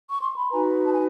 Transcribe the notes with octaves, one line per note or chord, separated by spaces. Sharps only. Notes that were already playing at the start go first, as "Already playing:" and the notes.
C#6
C6
B5
D#4 F#4 B4 G#5 A#5
A5
G#5